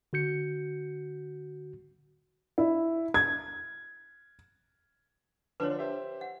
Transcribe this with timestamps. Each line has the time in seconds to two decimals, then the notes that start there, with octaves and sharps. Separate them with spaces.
0.13 D3 F#4 G6 C#7
2.58 E4
3.14 G#6
5.60 D3 F3 D4 B4 C#5
5.79 G4 C5 E5
6.21 F#5